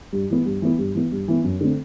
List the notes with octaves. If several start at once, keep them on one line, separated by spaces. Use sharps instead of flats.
G2
E3 B3
G2
E3 B3
G2
E3 B3
G2
E3 B3
F#2
D3 A3 C4